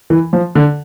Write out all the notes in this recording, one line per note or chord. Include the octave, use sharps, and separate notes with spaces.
E3
F3
D3